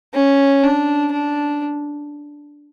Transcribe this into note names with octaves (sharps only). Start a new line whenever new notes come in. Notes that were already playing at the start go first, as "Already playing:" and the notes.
C#4
D4
D4